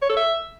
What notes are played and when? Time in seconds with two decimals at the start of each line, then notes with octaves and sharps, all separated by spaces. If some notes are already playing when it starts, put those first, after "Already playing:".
0.02 C#5
0.10 A4
0.17 E5